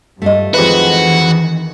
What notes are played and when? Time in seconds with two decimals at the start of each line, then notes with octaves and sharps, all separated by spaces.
0.22 G2 A3 F4 D#5
0.54 F2 D#3 E3 G#3 F#4 B4